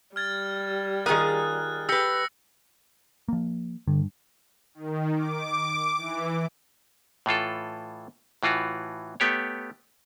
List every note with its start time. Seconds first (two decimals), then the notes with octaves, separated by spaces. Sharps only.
0.16 G3 F6 G#6 A6
1.06 D#3 F4 G#4 A#4 D#6 F#6
1.89 G4 B4 E6 A#6 C#7
3.28 F3 A#3
3.88 G2 D3
4.74 D#3
5.15 D6
5.98 E3
7.26 A2 E3 F4 A4
8.43 A2 E3 F4 F#4
9.20 A3 B3 G4 C#5